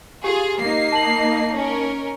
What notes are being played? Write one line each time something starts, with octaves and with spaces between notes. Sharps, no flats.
F4 G4 G#4
A#3 D#4 C7
A5 F#7
C#4 A#4